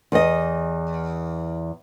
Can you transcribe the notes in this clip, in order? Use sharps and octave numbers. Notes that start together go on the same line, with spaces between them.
E2 D#5